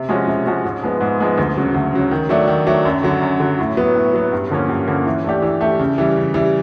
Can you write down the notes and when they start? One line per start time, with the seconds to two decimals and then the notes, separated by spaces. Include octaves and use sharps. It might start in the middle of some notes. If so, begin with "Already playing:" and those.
Already playing: C3
0.09 F3 G#3 C#4 F#4
0.27 C3
0.45 F3 G#3 C#4 F#4
0.65 G#2
0.83 F3 G#3 B3
1.01 G#2
1.19 F3 G#3 B3
1.38 D2
1.57 C#3 F#3
1.74 D2
1.93 C#3 F#3
2.11 D#3
2.29 F#3 A3 D4
2.48 D#3
2.67 F#3 A3 D4
2.85 F#2
3.03 D3 F#3
3.22 F#2
3.40 D3 F#3
3.59 A2
3.77 F#3 B3
3.96 A2
4.14 F#3 B3
4.32 G2
4.50 D3 F3 A#3 C#4
4.69 G2
4.87 D3 F3 A#3 C#4
5.06 E3
5.24 A3 D4 G4
5.42 E3
5.61 A3 D4 G4
5.79 C#3
5.98 E3 G3
6.17 C#3
6.34 E3 G3